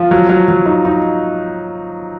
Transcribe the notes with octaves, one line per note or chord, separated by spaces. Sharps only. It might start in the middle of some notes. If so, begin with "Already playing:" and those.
Already playing: F3
F#3
F#3
F#3
D#4
D#4